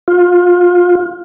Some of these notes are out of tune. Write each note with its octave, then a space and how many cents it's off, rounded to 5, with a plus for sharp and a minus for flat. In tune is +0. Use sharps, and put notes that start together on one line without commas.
F4 +25